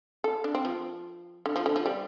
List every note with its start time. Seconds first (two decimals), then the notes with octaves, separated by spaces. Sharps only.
0.24 A4
0.44 D4
0.55 C4
0.65 F3
1.46 D3
1.56 F3
1.66 D3
1.76 F3
1.86 G3